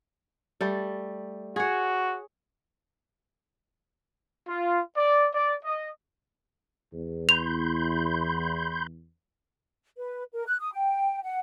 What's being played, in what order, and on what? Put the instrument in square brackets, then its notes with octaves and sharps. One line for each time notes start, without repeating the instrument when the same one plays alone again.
[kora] G3 A3
[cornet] F#4 [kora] G#4 C#5
[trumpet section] F4
D5
D5
D#5
[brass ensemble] E2
[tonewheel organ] B5 C6 G6 [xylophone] F7
[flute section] B4
A#4
F#6
D#6
G5
F#5